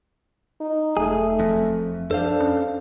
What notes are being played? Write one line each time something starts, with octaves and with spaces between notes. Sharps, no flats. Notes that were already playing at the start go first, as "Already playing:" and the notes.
D#4
E1 A3 G#4
F2
F2 D4 A4 C5 F5
C#4